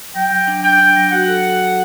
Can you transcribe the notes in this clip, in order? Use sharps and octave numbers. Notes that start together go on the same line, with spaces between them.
F#3 G5
F#3
D4
D4 G5
D4
F#3
F#4 F#5
A4